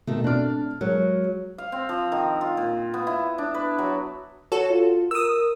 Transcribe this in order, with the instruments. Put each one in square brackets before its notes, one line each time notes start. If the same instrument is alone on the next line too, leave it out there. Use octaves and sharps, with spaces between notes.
[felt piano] B2 [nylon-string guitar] D#3 A3
[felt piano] A3 C4 F6 [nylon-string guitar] D4 D5
[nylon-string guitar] F#3 [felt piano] G#3 A#4 C#5
[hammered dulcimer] F5
C4
F3
D#3
F4
A#2
B3
E4
D4
B4
F#3
[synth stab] F#4 A4 [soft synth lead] C#5
[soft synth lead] F4
[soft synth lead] A#4 [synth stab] D#6 E6